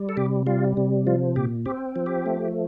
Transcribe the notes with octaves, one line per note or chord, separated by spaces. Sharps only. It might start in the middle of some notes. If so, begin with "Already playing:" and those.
Already playing: G3
A4
C3 G4
G3 F4
C3
F3 F4
A#2 G4
C4 G4
F3
G4
A3